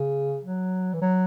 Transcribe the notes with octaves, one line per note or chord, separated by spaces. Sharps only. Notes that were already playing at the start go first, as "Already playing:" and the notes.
Already playing: C#3
F#3
E3
F#3